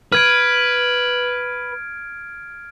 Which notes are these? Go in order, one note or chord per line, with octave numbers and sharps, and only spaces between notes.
B4 F6 G#6 D7